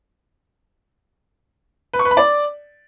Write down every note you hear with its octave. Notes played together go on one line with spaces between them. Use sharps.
B4
C#6
B4
B5
D5